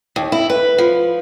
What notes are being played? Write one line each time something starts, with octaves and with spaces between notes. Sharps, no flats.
D#2
E4
B4
F3